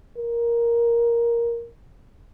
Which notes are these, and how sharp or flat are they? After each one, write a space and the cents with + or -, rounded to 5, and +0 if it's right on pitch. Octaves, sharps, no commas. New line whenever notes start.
A#4 +5